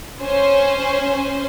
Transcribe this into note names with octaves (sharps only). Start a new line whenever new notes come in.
C#4 C5